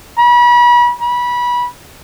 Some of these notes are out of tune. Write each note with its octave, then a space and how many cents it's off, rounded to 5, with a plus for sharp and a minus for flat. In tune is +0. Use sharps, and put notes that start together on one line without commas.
B5 -35
B5 -25